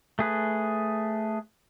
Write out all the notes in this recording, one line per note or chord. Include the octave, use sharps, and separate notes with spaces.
A3 G#4 B4